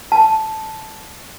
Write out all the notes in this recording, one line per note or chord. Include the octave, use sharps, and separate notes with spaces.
A5